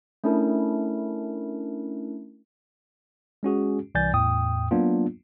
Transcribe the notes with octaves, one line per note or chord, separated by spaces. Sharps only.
A3 C#4 D4 E4 A#4
G#3 C#4 F#4 G#4
C2 E3 D5 G#5 G6 A6
E2 A2 G5 D#6
F#3 A#3 B3 D4 F4